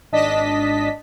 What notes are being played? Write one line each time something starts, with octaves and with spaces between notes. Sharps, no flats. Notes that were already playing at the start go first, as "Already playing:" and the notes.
G#1 D4 D#5 A5 B6